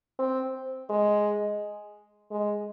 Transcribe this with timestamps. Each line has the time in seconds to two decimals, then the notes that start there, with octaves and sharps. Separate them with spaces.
0.19 C4
0.90 G#3
2.31 G#3